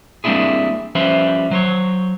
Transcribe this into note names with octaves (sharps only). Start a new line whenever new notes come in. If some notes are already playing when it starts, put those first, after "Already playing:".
G3 A#3 C4 D4 E4 G#4
F3 G3 C#4 B4 C5 E5
F#3 C5 C#5